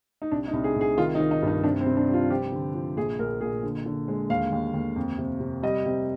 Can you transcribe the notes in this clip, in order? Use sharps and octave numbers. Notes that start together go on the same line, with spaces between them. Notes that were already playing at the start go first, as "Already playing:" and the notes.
D#4
C2 D4
D#4
C2
G#4
C2
G#4
D#3 F4
D#4
D#3
D#4
G2
D#4
C3 D4
C4
C3
D4
G3 F4
F3 G4
D3
F3
A#1 G#4
A#1 A#4
A#2 G#4
D3
D3
G#3
D#2 F5
D#2
D#2
F2
C3
C3
G3 D#5
C3